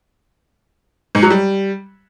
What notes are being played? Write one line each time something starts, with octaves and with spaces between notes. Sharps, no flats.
G#2
F#3
G3